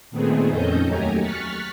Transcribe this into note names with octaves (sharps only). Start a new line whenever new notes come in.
A#2 D#3 A3 B3 C4 G#4
F2 D#3 C#4 A4 D#5 G6
D#2 F#3 A3 G4 G#5 A#5
C#6 F6 F#6 A6 B6 C#7